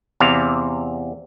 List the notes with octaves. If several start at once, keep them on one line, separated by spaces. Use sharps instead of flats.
E2 C3 F5